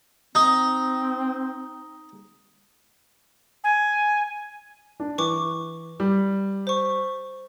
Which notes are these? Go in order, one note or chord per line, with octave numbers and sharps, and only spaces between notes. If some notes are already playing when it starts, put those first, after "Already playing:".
C4 D#4
G#5
D4
E3 B4 C#6 D6
G3
C5 C#6